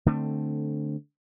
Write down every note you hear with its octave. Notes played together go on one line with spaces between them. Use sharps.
D3 A3 C4